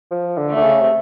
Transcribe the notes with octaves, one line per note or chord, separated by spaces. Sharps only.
F3
D3
A3
D3
C#3
C3